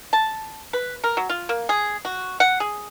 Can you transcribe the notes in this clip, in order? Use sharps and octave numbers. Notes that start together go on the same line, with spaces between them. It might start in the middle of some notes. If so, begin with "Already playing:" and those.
A5
B4
A#4
F#3
F4
A#3
G#4
F#4
F#5
G#4